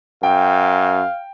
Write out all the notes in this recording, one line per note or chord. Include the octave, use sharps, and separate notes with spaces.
F#2 F5 G5